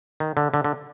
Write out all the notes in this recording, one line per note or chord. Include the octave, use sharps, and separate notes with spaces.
D#3
D3
D3
D3